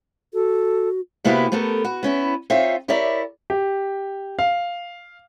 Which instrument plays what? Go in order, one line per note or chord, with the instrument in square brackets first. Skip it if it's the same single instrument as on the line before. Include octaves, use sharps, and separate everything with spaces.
[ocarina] F#4 [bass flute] A4
[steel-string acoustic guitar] C3 A#3 B3 E4 F#4 G4
A3 B3 G4 A4 A#4
F#4
B3 C#4 E4
C4 D#4 F4 C#5 E5 F5
E4 G4 A#4 C#5 D5 E5
[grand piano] G4
F5